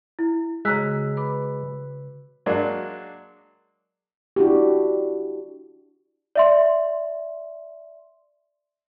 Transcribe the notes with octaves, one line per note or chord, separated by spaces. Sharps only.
E4
C#3 G#3 F#4 A#5 E6 F#6 B6
B4 B5 D6
F#3 G#3 A#3 D4
D4 E4 F#4 G4
D5 E5 C6